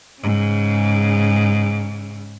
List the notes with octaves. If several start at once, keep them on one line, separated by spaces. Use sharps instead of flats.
G#2 C#3